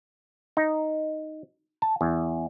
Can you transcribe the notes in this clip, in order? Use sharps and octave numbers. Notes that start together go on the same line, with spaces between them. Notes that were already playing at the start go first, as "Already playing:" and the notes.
D#4
A5
E2